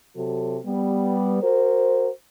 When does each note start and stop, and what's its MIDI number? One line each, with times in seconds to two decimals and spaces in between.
0.16 0.58 48
0.16 0.58 54
0.16 0.58 66
0.16 0.58 69
0.66 1.40 55
0.66 1.40 59
1.42 2.08 66
1.42 2.08 70
1.42 2.08 72